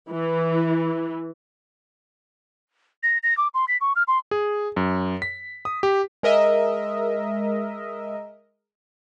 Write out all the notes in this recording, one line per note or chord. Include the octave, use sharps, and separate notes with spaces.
E3
A#6
A#6
D6
C6
B6
C#6
F6
C6
G#4
F#2
B6
D#6
G4
G#3 A#4 D#5 E5